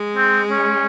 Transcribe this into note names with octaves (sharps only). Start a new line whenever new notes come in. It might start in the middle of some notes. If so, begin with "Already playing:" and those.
Already playing: G#3
C4
C#4